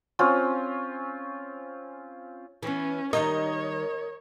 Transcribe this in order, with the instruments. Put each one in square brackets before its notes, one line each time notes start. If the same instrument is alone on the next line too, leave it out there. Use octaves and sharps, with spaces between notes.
[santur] C4 C#4 F4
[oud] E3 B3 [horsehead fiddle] C#4
[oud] D#3 G3 D#4 [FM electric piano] A#4 [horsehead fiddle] C#5 [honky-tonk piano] D#5